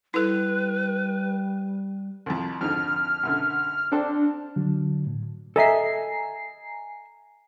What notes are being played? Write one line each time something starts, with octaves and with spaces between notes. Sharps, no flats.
G3 E4 A4 B4
C2 F2
F2 G#2 D3 F6
B1 F#2 D3
C4 D4 A4 C5
D3 F#3
A2
A4 D#5 E5 G#5 A#5 C7